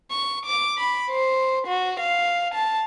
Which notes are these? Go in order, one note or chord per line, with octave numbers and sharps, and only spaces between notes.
C#6
D6
B5
C5
F#4
F5
A5